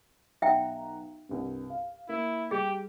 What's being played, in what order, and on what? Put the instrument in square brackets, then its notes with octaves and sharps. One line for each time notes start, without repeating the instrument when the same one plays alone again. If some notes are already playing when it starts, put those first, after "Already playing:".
[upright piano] B1 F#5 A#5 [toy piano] E5 G5
[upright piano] C2 G2
F5
[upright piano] A#3 [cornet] E4
[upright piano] G3 [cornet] G4 [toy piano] G#4